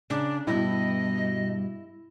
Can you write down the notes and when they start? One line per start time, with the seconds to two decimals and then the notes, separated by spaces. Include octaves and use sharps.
0.10 C#3 D4 A#5
0.47 G2 B2 E4 D#5